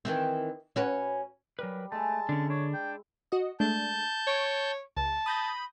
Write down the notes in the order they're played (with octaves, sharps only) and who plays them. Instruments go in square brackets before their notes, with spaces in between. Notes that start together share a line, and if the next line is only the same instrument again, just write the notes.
[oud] D#3 E3 C4
C#4 F#4 B4
[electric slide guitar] F#3 A#4 B4 [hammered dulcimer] G3 B5
[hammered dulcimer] G#3 E4 [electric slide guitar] A3 [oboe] A5
[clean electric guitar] D3 [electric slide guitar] C#4 D4
[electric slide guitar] D4 [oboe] C#5
[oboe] G5
[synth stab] F#4 D#5
[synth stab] G#3 A3 D4 [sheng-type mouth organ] A5 G6
[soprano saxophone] C#5 [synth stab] C#6 G#6 D7
[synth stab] C#2 [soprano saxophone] A5
[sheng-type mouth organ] B5 [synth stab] D#6 G6 A#6